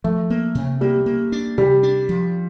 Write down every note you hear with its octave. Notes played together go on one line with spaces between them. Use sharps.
F3 A3
A#3
C3
G3 A#3
A#3
D4
C3 G3
D4
F3